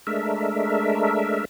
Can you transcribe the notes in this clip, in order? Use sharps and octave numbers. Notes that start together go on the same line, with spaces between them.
G#3 A3 D4 A#4 E5